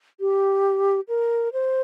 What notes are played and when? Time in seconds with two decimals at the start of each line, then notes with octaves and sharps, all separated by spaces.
0.20 G4
1.09 A#4
1.53 C5